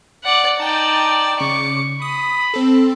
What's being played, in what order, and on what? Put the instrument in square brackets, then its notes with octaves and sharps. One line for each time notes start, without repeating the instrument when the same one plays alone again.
[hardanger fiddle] D5 F#5
[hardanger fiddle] D#4 D5 [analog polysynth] G5 A5
[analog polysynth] C#3 D6 [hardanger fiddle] C#6
[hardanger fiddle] B5 [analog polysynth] D#6
[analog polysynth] C4 A4